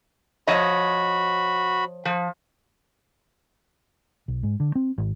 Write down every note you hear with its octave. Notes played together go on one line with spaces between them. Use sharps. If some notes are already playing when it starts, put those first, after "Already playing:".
F3 F#4 C#5 D#5 B5
F3
B1
G#2
D3
C4
G#1